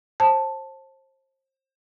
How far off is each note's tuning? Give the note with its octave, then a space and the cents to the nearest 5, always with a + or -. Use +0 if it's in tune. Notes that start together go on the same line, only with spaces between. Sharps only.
C5 +35 A5 +0